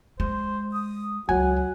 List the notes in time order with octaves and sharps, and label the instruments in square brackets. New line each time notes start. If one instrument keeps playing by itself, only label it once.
[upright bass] G#3 [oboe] C5
[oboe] D#6
[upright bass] C#2 [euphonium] F#3 [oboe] F#5 [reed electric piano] G#5